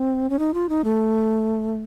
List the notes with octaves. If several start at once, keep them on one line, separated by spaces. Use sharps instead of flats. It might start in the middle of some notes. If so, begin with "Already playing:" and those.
Already playing: C4
C#4
D#4
F4
D#4
A3